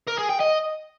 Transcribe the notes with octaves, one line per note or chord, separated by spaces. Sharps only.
A#4
G#4
G5
D#5